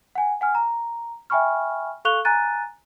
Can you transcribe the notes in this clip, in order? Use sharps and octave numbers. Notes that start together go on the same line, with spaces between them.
F#5 G#5
F#5 G#5 F6
A#5
E5 G5 G#5 B5 C#6 F6
A4 F5 C#6 F#6 F7 G7
G#5 A#5 F#6 A6 D#7